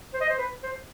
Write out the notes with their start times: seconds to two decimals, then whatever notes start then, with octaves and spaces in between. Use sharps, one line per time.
0.14 C5
0.21 D#5
0.29 C5
0.38 B4
0.63 C5